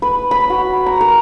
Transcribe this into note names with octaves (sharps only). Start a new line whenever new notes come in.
B4
B5
F#4
A#5
A#4